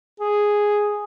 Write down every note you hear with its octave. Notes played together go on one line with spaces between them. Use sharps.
G#4